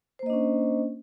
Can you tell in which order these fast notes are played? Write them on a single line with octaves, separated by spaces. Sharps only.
C5 A#3 D#5 D4 C#4